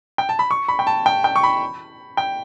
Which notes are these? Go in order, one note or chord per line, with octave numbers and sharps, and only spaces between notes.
G5
A5
B5
C#6
B5
G5
A5
G5
G5
C#6
B5
G5